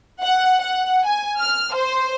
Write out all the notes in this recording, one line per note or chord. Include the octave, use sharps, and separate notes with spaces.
F#5
F#5
G#5
F6
C5